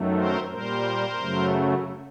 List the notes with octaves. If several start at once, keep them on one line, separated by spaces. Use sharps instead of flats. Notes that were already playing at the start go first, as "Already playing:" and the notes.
Already playing: F#2 D#3 F#3 A3
A#4 C5
A#2 G3 A#4 C5
F#2 C#3 F#3 A3